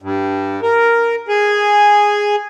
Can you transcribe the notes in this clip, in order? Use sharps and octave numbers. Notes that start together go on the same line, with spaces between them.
G2
A#4
G#4